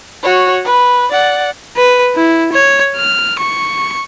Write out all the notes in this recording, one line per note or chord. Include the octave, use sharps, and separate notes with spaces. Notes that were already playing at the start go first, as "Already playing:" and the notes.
F#4 C#5
B4
D5 F#5
B4
E4
C#5
F6
C#6